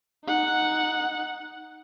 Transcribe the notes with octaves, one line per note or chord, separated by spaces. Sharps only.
D#4 F#5